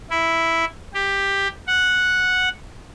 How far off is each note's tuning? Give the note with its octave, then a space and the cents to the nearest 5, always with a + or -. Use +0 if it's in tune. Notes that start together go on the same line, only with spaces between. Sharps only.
E4 +0
G4 +10
F#5 -5